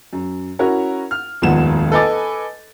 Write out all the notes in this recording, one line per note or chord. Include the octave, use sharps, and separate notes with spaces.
F#2
C#4 E4 F#4 A#4 C#5
F6
D#1 G#1 F2 B3 E7
A4 B4 D#5 G#5 D6 A6